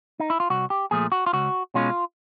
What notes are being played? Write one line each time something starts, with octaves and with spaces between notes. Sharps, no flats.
D#4
E4
F4
C2 F#4
G4
A#2 F3 A3 G#4
F#4
F4
C#2 F#4
B2 G#3 C#4 F4